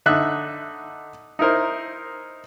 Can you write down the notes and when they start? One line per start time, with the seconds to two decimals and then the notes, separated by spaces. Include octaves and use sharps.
0.06 D3 D#4 E5 F#6
1.39 D#4 E4 A#4 C5